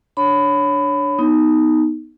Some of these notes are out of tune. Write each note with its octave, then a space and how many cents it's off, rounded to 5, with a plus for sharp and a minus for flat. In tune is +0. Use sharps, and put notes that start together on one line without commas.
D4 +0 C#5 +0 B5 +20
B3 -5 D#4 +0